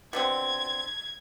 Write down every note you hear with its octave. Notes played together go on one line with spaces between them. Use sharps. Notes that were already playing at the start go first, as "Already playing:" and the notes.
B2 D3 C4 G#6